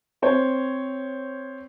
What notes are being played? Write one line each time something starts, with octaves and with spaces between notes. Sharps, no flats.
C4 C5 C#5